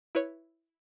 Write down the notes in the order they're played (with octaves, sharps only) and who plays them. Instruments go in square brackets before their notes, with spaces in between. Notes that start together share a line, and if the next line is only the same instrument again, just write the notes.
[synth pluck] E4 B4 C#5